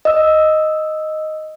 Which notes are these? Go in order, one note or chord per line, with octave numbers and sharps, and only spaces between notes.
D#5 E6